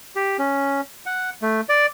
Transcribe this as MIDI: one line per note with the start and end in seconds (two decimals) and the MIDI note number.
0.16 0.37 67
0.39 0.81 61
1.06 1.30 78
1.42 1.61 57
1.69 1.86 74